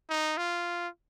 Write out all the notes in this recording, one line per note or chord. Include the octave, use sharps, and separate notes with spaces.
D#4
F4